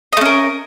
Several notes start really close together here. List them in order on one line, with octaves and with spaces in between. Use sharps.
D#5 A3 C#4 A#4